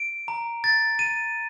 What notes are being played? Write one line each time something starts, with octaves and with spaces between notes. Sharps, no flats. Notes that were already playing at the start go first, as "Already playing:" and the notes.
Already playing: D7
A#5
A6
D#7